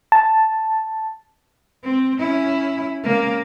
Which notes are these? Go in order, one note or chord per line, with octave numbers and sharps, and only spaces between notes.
A5
C4
C#4 E4
C#3 A#3